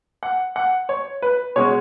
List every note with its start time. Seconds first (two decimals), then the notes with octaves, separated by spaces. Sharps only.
0.23 F#5
0.56 F#5
0.89 C#5
1.22 B4
1.56 B2 G#3 C#4 C#5